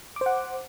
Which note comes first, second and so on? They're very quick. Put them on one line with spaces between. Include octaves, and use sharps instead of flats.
D6 C5 F#5